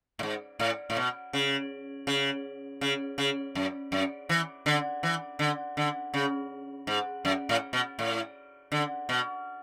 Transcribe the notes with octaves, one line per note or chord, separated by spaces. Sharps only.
A2
G#2
A2
A2
B2
C#3
C#3
C#3
C#3
F#2
F#2
E3
D3
E3
D3
D3
C#3
G#2
F#2
A2
B2
A2
D3
B2